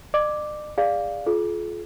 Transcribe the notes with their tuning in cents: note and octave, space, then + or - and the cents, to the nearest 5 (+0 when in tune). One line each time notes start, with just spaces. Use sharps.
D5 +45 D6 +0
G#4 -30 D5 +0 F5 +0
F4 +0 G#4 +45